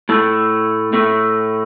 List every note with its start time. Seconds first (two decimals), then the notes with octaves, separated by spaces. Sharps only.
0.09 A2 A3
0.93 A2 A3